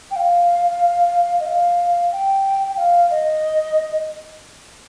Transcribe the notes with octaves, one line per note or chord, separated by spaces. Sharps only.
G5
F5
D#5
F5
G5
F5
D#5